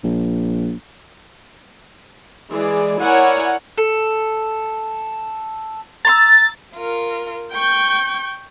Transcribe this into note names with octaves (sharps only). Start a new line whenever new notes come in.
A#1
E3 G#3 G#4 D5
E4 A#4 C#5 D5 F#5 G#5
A4
A#5 C6 E6 A6
F4 A#4
G5 C#6 G6